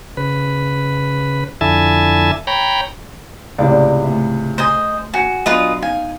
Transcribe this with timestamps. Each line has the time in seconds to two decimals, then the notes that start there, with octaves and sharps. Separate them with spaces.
0.17 C#3 B4
1.61 F2 D3 E4 E5 G#5 A5
2.47 C#5 G5 A#5 B5
3.58 C#2 A2 C3 D5
4.04 A3 G#4 E5
4.58 C5 D#5 G#5
5.14 F#4 G#5 C#7
5.46 F#3 B3 D4 F4 B4 D#5
5.82 D#4 F5 G#5